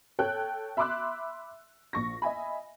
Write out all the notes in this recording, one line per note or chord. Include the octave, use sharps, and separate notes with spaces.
A4 C#5 G5 F#6
E5 B5 C6 D6 E6 F#6
A#1 C#6 A#6
D#5 E5 G#5 B5